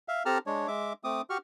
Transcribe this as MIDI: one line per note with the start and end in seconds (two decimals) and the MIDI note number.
0.08 0.23 76
0.08 0.23 77
0.26 0.38 60
0.26 0.38 67
0.26 0.38 69
0.26 0.38 81
0.26 0.38 82
0.26 0.38 89
0.47 0.67 56
0.47 0.67 62
0.47 0.67 73
0.68 0.93 56
0.68 0.93 76
0.68 0.93 86
1.04 1.22 57
1.04 1.22 60
1.04 1.22 86
1.04 1.22 87
1.30 1.38 66
1.30 1.38 67
1.30 1.38 85
1.30 1.38 89